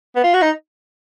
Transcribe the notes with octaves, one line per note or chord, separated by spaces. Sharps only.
B3
F4
F#4
D#4